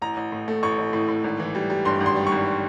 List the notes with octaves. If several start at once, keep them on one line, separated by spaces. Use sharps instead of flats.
A1 A#5
A1
A2
A3
A1 C#6
A1
A2
A2
G#1
E3
G3
G3
G2 C6
G#1
C6
G3
C#6
G#1